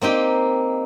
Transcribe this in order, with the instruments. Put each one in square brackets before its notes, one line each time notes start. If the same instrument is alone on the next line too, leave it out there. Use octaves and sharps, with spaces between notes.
[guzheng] A#3 C4 D#4 G4